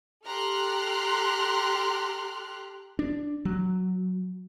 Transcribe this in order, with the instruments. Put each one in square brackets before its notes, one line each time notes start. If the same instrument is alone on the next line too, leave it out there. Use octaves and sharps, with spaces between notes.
[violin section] G4 A4 A#5 C6 F6 F#6
[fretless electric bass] D4
F#3